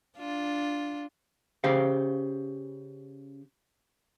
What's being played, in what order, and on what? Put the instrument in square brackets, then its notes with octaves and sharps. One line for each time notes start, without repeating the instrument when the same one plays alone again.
[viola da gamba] D4 F4
[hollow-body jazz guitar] C#3 G4 C5 F5